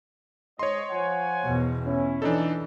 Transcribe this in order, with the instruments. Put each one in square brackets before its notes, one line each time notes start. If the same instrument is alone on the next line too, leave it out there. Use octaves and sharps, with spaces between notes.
[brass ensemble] G#2 D#5 [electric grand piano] C#5 C6
[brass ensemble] F3 F#5 G#5
[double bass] E2 B2
[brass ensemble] C#4 E4
[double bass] E3 [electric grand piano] D4 D#4 A4